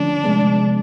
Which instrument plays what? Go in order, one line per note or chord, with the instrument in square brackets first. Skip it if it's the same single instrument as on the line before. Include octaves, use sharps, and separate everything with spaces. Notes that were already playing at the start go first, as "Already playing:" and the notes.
Already playing: [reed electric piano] D3 F3 A3 C#4 [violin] D4
[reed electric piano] C3 F3 G#3 B3